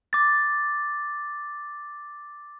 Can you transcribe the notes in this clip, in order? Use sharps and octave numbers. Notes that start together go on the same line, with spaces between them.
D6 A6